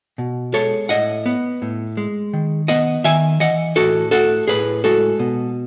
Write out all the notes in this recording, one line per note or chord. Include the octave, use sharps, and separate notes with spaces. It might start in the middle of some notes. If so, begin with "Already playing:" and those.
B2
G#3 A4 C#5
A2 D#5 F#5
B3
A2
G#3
D#3
B3 D#5 F#5
D#3 E5 G#5
E3 D#5 F#5
A2 F#4 A4
A3 F#4 A4
A2 G#4 B4
G#3 F#4 A4
B2